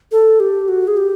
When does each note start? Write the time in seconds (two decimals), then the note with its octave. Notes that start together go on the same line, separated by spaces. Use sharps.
0.12 A4
0.40 G4
0.68 F#4
0.88 G#4
0.97 G4